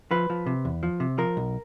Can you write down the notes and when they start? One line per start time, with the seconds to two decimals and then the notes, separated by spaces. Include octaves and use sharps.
0.11 F3 B4
0.30 F3
0.46 C3
0.65 E2
0.83 F3
1.00 C3
1.18 F3 A#4
1.37 B1